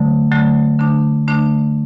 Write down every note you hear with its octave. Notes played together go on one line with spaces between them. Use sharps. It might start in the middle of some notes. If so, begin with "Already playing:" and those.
Already playing: D3 F#3 A3
D3 F#3 A3
D3 A3 D4
D3 A3 D4